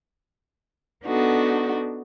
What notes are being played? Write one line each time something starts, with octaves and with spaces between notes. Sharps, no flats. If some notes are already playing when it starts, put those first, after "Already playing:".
B3 D4 D#4 F#4 A4